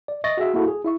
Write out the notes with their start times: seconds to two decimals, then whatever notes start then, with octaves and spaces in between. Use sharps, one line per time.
0.08 D5
0.24 D#5 E5 C#6 A6 A#6
0.37 F#4 G#4 E5
0.54 A#3 E4 F#4 A4 F#5
0.68 G#4
0.85 E4 E5 C#6